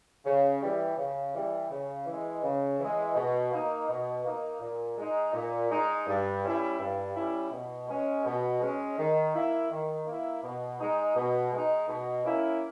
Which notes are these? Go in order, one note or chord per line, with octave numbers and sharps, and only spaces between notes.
C#3
E3 G3
C#3
E3 G3
C#3
E3 G#3
C#3
E3 G#3
B2
A#3 D#4
B2
A#3 D#4
A#2
G#3 D#4
A#2
G#3 D#4
G2
G3 C#4 E4
G2
G3 C#4 E4
B2
G#3 C#4
B2
G#3 C#4
D#3
A#3 E4
D#3
A#3 E4
B2
G#3 D#4
B2
G#3 D#4
B2
A#3 C#4 E4